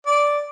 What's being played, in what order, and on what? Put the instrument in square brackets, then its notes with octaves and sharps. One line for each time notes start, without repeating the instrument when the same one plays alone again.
[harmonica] D5